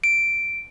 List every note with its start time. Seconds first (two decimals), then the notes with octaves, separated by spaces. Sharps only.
0.04 D7